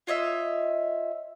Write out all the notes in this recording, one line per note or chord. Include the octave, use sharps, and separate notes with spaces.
F4 C#5 D#5 E5